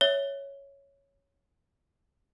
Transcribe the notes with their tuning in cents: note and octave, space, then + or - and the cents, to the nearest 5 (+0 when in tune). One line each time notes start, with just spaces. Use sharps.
C#5 +0 E5 -10